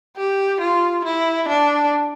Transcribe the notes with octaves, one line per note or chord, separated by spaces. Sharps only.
G4
F4
E4
D4